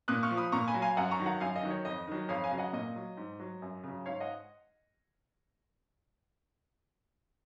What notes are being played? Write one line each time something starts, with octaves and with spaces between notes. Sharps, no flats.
A#2 D#6 F#6
C#6 F6
F3
B5 D#6
A#2 A#5 C#6
G#5 B5
F#3
F5 G#5
F#2 F#5 A#5
A#5 C#6
D#3 F#3
F#5 A#5
F#2 F5 G#5
D#5
D#3 F#3
C#5
F2 D#5
D#3 F#3
F2 C#5 F5
F5 G#5
C#3 F#3
D#5 F#5
A#2 D#5
F#3
G#2
F#3
F#2
C#3 F#3
G#2 C#5 F5
D#5 F#5